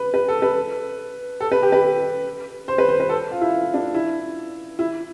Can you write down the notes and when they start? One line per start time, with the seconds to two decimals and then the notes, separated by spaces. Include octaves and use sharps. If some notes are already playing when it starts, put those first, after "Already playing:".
Already playing: B4
0.14 B4
0.28 A4
0.42 B4
1.41 A4
1.52 B4
1.63 G4
1.72 B4
2.68 C5
2.78 B4
2.89 C5
3.00 B4
3.09 A4
3.32 F4
3.41 E4
3.74 D4
3.94 E4
4.79 E4